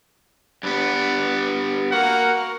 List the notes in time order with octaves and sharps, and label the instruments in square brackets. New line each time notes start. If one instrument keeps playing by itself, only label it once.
[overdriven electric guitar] G2 B3 [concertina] B4 D5
[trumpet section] A#3 F#5 [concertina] F#4 A#4 F6